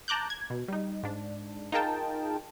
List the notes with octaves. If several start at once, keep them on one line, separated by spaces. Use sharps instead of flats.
A5 A#5 D6 F#6 G6
G#6
B2
G3 D#4
G#2 D4
D#4 F4 G#4 A#4 G5 A5